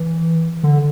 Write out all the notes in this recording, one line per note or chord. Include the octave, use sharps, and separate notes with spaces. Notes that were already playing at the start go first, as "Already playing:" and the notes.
Already playing: E3
D3